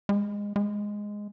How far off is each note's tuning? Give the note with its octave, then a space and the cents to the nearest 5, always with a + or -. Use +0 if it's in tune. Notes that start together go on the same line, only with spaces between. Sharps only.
G#3 -20
G#3 -5